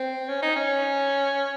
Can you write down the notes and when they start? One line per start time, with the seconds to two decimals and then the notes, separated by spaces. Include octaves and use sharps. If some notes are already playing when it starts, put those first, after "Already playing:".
Already playing: C4
0.29 C#4
0.42 D#4
0.56 C#4